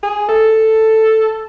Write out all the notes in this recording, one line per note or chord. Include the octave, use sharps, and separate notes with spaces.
G#4
A4